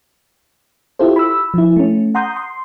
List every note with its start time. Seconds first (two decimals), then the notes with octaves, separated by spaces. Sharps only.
0.99 E4 F4 G4 A4 C5
1.16 B5 E6
1.54 F3 E4
1.76 A3 C#4
2.15 F#5 A#5 C6 D#6 G6
2.36 C6